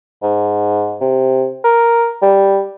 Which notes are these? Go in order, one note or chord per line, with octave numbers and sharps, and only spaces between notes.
G#2
C3
A#4
G3